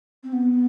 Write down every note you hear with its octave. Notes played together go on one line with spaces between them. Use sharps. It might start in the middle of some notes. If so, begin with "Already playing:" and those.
C4
B3